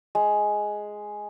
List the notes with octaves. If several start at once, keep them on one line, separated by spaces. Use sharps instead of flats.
G#3